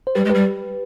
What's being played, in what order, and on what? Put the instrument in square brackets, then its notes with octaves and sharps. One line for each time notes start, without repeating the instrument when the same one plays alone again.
[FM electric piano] C5
[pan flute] G3 [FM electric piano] G4 B4
[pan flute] G#3
[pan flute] G3 [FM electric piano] G4 B4